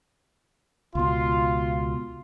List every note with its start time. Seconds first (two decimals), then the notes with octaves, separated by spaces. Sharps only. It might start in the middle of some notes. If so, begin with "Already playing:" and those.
0.95 C#2 B2 F4 C6